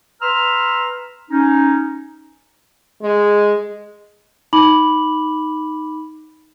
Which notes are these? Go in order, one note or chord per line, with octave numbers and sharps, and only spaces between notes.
B4 A#5 C6 E6 F6
C#4 D#4
G#3
D#4 B5 D6 F#7